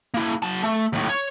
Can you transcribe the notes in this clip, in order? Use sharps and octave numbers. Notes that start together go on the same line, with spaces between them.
A#3 E4
F#3 A5
A3
D#2 A2
C#5